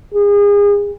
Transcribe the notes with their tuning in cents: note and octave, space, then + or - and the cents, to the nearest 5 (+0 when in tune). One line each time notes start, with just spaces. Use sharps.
G#4 -30